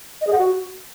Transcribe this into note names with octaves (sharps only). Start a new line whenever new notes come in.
D#5
G#4
F#5
F#4